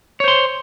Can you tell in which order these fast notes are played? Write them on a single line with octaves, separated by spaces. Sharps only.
C#5 C5 C6